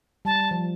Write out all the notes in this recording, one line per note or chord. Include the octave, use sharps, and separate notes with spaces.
G3 A5
F3